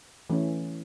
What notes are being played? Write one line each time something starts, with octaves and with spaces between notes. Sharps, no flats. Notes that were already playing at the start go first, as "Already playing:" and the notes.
E3 A3 C#4